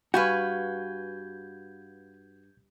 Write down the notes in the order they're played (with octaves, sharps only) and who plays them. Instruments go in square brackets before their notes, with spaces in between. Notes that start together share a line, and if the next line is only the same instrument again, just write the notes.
[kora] G2 [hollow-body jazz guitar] F#4 [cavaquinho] B4 F5 G#5 [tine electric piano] G6 G#6